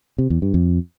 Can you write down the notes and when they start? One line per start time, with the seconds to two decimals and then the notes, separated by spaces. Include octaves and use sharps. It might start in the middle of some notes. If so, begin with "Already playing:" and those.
0.18 C3
0.30 E2
0.42 G2
0.54 F2